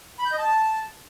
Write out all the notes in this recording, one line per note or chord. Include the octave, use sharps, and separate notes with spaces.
B5
G6
D#5
A5